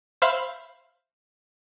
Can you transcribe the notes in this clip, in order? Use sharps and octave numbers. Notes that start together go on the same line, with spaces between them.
C5 E5 F5 B5